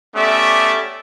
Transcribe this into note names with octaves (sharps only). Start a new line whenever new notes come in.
A3 B3 C#4 G4 D5 E5